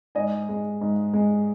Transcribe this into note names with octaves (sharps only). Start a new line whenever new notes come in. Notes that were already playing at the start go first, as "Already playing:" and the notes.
G#2 D#5 G#5
G#3
G#2
G#3